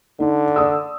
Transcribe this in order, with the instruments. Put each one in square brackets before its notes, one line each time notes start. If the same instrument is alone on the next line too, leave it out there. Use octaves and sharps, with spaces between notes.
[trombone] D3 [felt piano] D#4
[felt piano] D5 D#6 E6